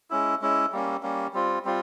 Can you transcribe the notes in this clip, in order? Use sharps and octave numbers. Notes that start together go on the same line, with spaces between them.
G#3 C#4 E4
G#3 C#4 E4
G3 A#3 C#4
G3 A#3 C#4
G3 C4 F4
G3 C4 F4